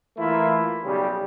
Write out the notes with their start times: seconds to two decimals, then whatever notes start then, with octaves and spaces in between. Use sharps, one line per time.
0.17 E3 A3 A#3 E4 F4
0.83 B1 C#3 G3